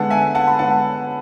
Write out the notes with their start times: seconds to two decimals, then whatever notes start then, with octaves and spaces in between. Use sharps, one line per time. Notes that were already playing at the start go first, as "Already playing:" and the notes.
Already playing: D3 G#3 B3 F#5 A5
0.10 E5 G#5
0.35 F#5 A5
0.48 B5
0.59 D3 G#3 B3 F#5 A5